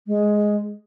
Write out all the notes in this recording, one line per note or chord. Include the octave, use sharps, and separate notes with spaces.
G#3